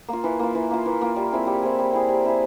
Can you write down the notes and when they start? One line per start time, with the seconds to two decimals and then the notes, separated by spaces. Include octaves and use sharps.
0.09 A#3 F4
0.24 E3
0.39 A#3 F4
0.55 E3
0.70 A#3 F4
0.86 E3
1.01 A#3 F4
1.16 G3
1.32 C4 E4 G#4
1.47 G3
1.62 C4 E4 G#4
1.79 G3
1.93 C4 E4 G#4
2.09 G3
2.24 C4 E4 G#4